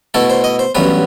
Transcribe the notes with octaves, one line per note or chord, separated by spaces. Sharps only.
B2 A3 E4 A4
C5
D#5
C5
A1 G2 F#3 B3 B4